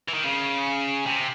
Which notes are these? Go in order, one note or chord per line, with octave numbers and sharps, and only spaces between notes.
E3
D#3
C#3
C3